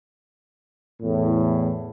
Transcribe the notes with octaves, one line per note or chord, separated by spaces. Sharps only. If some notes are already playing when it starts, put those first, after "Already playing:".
E2 A2